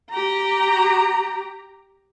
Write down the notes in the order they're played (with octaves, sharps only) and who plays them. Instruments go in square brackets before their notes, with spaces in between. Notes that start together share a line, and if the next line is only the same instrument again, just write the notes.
[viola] G4 A#5